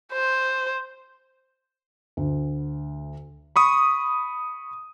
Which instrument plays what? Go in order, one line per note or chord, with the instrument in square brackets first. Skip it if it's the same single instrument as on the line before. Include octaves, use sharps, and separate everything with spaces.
[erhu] C5
[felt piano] D2
[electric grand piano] B5 C#6 D#6